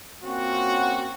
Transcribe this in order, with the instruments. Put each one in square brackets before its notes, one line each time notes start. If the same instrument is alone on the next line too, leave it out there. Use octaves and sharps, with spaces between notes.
[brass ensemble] A#3 C4 C#4 F4 F#4